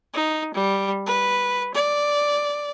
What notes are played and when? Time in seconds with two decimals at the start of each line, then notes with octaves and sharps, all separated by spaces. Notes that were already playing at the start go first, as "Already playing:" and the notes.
0.14 D#4
0.55 G3
1.06 B4
1.75 D5